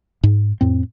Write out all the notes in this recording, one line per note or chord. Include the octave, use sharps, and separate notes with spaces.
G#2
F2 A2 C4